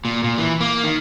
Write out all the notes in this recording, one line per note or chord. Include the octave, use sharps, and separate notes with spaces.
A#2
A#2
E3
A#3
D#3